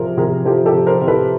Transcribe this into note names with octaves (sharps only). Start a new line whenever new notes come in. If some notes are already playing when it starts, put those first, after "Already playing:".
Already playing: C3 F3 G#4 A#4
C3 G#4 A#4
F3 G4 A4
G4 A4
C3
A#4 C5
C3
A4 B4